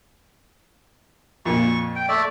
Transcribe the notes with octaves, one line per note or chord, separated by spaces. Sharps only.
F2 A#2 C#6
G5
A3 D5 E5